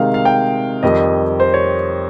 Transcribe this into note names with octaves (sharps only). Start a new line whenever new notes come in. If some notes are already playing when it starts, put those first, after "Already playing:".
Already playing: C3 D#3 G#3 D#4 F5
F5
G5
F2 D#3 G3 D#5
C5
C#5